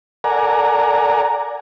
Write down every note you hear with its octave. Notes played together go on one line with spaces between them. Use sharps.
A4 A#4 D5 F#5 G#5 A#5